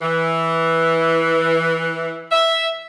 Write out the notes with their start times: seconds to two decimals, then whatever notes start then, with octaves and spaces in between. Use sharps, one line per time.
0.02 E3
2.31 E5